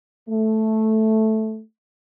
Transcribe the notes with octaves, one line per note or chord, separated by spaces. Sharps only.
A3